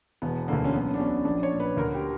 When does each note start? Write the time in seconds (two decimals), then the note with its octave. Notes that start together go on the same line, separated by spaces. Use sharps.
0.22 E1 B3
0.48 D2 D3 A#3
0.65 C#4
0.73 B1 B3
0.94 D4
0.99 B2 C#4
1.25 A#1 D4
1.43 C#5
1.52 A#2
1.60 B4
1.77 D2 A#4
1.94 G4